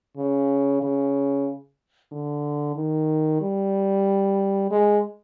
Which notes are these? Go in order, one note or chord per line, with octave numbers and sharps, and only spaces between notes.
C#3
C#3
D3
D#3
G3
G#3